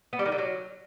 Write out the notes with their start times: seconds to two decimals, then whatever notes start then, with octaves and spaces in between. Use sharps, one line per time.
0.13 B3
0.19 G3
0.26 D#3
0.32 D3
0.38 F#3